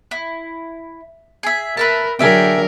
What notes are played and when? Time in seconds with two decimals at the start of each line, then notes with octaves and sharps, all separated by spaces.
0.11 E4
1.43 G#4 E5
1.77 A#4 B4 E5 A5
2.19 D3 F#3 G#4 A#4 E5 G5